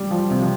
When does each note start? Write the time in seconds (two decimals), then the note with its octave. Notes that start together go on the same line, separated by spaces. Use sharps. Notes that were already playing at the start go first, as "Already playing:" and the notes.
Already playing: G3
0.11 F3
0.31 C3
0.41 F3